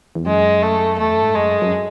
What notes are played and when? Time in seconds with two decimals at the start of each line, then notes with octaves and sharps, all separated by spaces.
0.15 E2
0.26 F#2 G#3
0.62 A3
0.98 E2 A3
1.11 F#2
1.23 G#2
1.35 F#2 G#3
1.62 F#2